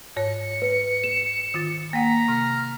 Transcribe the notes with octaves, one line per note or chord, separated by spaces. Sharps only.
G#2 C#5 C#7
B4
E7
D#3 F4 A6
A#3 F#5 A#5 B6
C3 F6